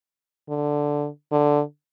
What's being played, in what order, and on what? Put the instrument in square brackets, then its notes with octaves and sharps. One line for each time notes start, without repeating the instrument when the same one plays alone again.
[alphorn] D3
D3